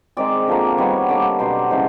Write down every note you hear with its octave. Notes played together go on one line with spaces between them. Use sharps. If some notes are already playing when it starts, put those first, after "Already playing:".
D#3 G#3 C4 D5
D3 F3 A#3
D#3 G3 B3 C#5
D3 G3 A#3 D5
B2 F#3 B3 D4 C5
C#3 E3 G#3 C5